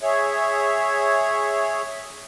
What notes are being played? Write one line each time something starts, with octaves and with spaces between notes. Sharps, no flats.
G#4 C#5 E5